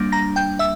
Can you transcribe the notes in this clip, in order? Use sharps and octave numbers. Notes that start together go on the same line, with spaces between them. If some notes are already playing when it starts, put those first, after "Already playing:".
Already playing: G3 A#3 D4
A#5 A#6
G5 G6
E5 E6